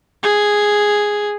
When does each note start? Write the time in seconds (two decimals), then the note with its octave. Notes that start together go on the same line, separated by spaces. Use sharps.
0.23 G#4